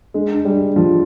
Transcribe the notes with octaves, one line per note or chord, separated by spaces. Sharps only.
G#3 D4
D4
G3
D4
F3 D4